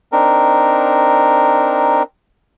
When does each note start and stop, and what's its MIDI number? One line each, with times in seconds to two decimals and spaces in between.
0.12 2.03 60
0.12 2.03 62
0.12 2.03 63
0.12 2.03 70